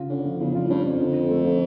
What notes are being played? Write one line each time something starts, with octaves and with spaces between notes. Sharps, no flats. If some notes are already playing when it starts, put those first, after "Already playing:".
Already playing: C#3 F4
D3 C#4
F3
E2 C#3
F2 F4
A2
G2 C#4
F2 F3
D3
D3
A3
F3